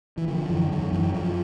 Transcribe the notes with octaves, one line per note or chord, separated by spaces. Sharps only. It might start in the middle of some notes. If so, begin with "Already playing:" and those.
E3
D3 F3
F#2 E3
F#2 D#3
F#2 E3
F#2 F3